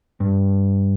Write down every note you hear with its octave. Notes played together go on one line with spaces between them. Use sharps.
G2